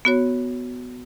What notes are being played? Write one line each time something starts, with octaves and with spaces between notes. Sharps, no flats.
B3 F#4 C#5